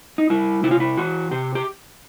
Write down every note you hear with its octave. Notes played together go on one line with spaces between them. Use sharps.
D#4
G3 E4
C3 E4
F4
E4
E3 F#4
C3 G4
G4